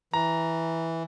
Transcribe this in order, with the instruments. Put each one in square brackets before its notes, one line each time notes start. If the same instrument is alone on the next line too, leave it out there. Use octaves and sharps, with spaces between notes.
[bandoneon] E3 [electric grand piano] A#5